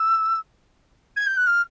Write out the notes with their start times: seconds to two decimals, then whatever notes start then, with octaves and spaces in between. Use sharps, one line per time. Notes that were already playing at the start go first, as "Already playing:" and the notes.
Already playing: E6
1.16 G#6
1.27 G6
1.37 F#6
1.47 F6